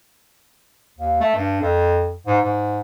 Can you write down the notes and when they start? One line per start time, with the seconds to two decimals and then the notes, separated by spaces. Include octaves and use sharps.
0.98 D#2
1.21 A3
1.35 G2
1.61 F2
2.27 G#2
2.44 G#2